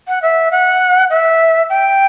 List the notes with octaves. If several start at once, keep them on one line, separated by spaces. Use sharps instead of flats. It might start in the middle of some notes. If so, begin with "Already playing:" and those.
F#5
E5
F#5
E5
G5